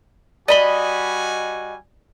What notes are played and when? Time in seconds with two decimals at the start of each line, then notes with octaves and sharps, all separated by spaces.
0.48 G3 F#4 D5 D#5 G#5 B5 G7